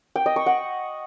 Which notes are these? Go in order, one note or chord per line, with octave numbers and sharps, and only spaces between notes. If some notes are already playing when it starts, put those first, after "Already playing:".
G5
D#5
C#6
F#5